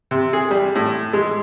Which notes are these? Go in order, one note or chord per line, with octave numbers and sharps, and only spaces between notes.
C3
G#4
G3
A2
G#3